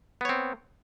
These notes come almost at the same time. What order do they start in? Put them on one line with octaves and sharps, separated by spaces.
B3 C#5 C4